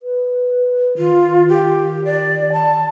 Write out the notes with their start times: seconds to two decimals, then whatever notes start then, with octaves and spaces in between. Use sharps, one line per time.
0.03 B4
0.98 D#3 F4
1.49 G4
2.05 D5
2.53 A5